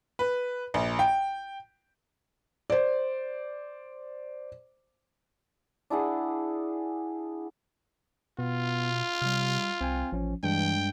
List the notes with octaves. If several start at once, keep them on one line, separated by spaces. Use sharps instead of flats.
B4
A#1
G5
C5 D5
D4 E4 G#4 F#5
B2 B3 F4
C3 G3 F6
C2 C4 G5 G#5
A1 F3 C#4
G2 E3 G#3 D4 G5